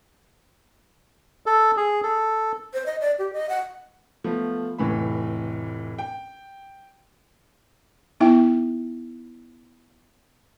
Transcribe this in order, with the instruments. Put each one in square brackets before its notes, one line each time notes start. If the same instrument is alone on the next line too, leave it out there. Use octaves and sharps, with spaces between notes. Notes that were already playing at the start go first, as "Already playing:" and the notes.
[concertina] A4
G#4
A4
[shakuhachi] C5
D#5
D5
G4
D#5
F#5
[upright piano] F3 A3 B3
F1 A2 E3 B5
G5
[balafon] B3 D#4 E4 E5 G5